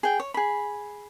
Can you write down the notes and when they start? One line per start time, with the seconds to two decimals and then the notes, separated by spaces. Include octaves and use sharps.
0.03 G#4 G5
0.20 C#5
0.34 G#4 B5